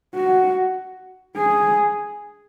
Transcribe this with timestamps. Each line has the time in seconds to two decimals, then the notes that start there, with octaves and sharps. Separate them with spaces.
0.15 F#4
1.36 G#4